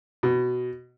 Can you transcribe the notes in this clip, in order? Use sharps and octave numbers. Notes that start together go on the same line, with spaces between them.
B2